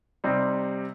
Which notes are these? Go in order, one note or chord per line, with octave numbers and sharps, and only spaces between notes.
C3 G3 C4 D#4